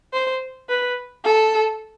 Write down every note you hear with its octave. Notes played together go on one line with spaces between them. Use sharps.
C5
B4
A4